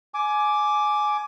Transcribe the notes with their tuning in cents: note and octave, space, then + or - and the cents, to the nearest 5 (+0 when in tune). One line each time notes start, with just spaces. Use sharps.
G#5 +15 D6 +0